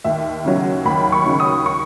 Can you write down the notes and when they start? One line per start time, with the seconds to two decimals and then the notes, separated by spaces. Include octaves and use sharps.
0.04 D#2 E5
0.45 C#3 F#3
0.85 D#2 B5
1.12 C#6
1.26 C#3 F#3
1.40 D#6
1.66 C#6